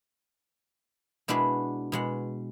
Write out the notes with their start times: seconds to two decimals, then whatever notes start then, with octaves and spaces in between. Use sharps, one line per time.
1.28 B2 G#3 D4 E4 F#4 B4
1.92 B2 G#3 F#5